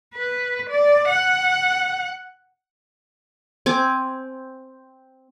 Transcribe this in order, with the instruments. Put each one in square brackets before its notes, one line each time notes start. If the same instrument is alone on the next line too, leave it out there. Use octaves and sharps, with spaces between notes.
[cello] B4
D5
F#5
[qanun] C4 G#5 D6